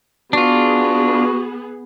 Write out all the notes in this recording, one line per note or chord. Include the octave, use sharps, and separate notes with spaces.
B3 D4 F4 F#4 G#4